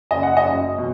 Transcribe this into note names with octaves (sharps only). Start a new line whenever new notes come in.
F#1 D#5
F#5
D#5
F#2
B2